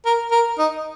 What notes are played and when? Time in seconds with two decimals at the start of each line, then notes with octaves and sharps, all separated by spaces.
0.05 A#4
0.31 A#4
0.58 D#4